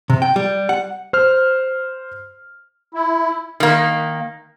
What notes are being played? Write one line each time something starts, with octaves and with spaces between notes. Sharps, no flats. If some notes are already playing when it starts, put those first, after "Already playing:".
C3
G5
G3
F#5
C5 F6
E4
D#3 A#3